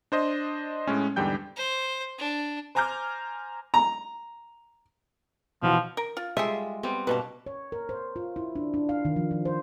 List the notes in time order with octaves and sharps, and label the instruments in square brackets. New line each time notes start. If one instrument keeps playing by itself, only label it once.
[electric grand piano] D4 C5 D#5
A2 G#3 C#4
E2 G#2 D3 G3 G5 G6
[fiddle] C5
D4
[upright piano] C5 G#5 A#5 D6 F6 G6
[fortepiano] A#5
[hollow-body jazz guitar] B2 E3 F#4 [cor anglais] F3
[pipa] A#4
F4
[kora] G3 G#3 F4 [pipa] G#4 A4 E5
[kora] G3 B3 C4
[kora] G2 B2 A#3 [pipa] B4 A5
[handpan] C#5
A#4
C5
F4
E4
D4
D4
F5
D#3
F3
F3
C5